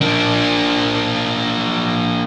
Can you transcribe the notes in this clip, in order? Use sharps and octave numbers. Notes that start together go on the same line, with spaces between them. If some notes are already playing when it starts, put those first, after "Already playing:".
A#3 D4